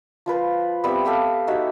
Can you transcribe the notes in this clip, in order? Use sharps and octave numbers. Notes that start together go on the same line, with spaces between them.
F3 F4 B4 C5
G3 B3 C4 E5
B3 G4 A4 F5
D#4 F#4 G4 E5